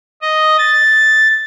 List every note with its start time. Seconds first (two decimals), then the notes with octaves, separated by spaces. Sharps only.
0.22 D#5
0.58 A6